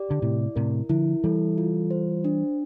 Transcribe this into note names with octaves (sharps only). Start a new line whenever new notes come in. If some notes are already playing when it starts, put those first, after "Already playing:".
Already playing: G4 D5
D3
A2 C3 E4
A2 C3 A#4
D3 F3 E4
E3 G3 A4
F4
C5
D4